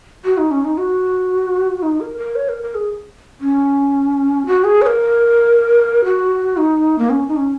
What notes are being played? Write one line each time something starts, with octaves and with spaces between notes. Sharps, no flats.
F#4
D#4
C#4
D#4
F#4
D#4
A#4
A#4
C#5
A#4
A#4
G#4
C#4
F#4
G#4
C#5
A#4
F#4
D#4
A#3
C#4
D#4
C#4